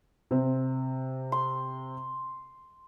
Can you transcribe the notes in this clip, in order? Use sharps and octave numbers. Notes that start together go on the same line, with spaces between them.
C3 C4
C6